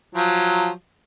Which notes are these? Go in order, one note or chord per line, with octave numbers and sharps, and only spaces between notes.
F3 F#3